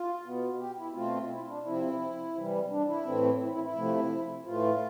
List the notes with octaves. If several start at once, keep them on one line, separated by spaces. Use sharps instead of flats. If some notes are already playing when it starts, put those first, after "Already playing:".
Already playing: F4
B2 B3
G4
E4
B2 A3 C4 F4
E4
D4
C3 F3 C4 E4
C3 E3 G3
D4
E4
A2 E3 A3 C4
E4
E4
E4
C3 F3 A3
A2 E3 A3 F4